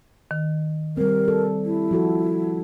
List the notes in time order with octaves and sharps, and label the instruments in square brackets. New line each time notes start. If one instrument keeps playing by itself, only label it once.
[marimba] D#3
[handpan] G3 C4 [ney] A#4
[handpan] A4
[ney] E4
[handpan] F3 F#4 A4